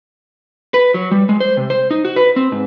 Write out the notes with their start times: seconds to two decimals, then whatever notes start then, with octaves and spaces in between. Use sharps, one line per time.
0.74 B4
0.94 F#3
1.11 G3
1.29 G#3
1.40 C5
1.57 C3
1.70 C5
1.91 D#4
2.05 F#4
2.16 B4
2.36 C4
2.52 G#2